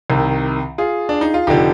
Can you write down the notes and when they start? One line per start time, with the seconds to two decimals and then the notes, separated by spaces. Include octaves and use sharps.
0.10 C2 C3 D#3
0.78 F4 G#4
1.09 D4
1.21 D#4
1.34 F4
1.47 F1 D3 F3 D#4 G4